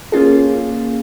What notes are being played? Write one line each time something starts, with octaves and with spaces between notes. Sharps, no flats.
A#3 C#4 F4 G#4